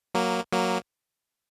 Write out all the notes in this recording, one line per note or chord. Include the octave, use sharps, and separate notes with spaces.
F#3 A#3
F#3 A#3